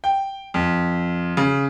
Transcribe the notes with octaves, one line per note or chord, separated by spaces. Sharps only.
G5
F2
C#3